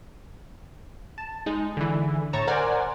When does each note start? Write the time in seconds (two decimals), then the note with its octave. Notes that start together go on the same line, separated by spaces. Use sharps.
1.18 A5
1.46 G#3 D#4
1.77 D3 E3
2.33 A2 C#5 A#5 A6 E7
2.47 A#4 C5 D5 F#5 G#5